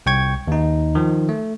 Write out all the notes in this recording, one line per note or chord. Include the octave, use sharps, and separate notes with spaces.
C2 G5 C#6 G#6
D#2 D#4
D#3 F3
A3